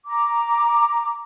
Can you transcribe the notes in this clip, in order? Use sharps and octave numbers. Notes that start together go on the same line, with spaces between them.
A#5 D6